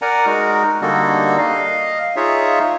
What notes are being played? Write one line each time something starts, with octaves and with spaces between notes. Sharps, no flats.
A#4 D5 F#5 G#5 A#5
G#3 D#4 F#4 A#4
D3 G3 A#3 D#4 F#4 A4
D#5 F5
D#4 F4 G#4 C#5 E5